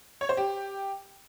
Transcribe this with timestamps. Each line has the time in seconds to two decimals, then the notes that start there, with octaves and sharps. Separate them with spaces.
0.21 C#5
0.29 C5
0.37 G4